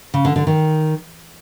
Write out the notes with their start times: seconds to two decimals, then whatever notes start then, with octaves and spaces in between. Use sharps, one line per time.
0.14 C#3
0.25 D3
0.36 D3
0.47 D#3